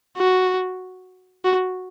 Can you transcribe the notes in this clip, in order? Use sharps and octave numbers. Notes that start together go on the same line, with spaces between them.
F#4
F#4